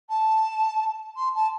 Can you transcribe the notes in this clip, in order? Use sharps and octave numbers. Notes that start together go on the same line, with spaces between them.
A5
C6
A5